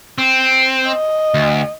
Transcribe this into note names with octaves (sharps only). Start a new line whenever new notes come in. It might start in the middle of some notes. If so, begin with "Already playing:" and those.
C4
D#5
D2